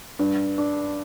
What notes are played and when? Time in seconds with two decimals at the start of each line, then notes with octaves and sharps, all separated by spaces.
0.19 G2
0.58 D4